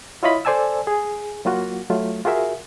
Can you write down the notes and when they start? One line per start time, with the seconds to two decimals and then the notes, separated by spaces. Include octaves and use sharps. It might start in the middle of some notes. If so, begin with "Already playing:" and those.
0.23 E4 F4 C#5 D#5 F5 B5
0.45 A4 C5 D5 G#5 A5 E6
0.87 G#4
1.45 F#3 A#3 F4 F#4
1.90 F#3 A3 F4
2.25 F4 F#4 G#4 A#4 E5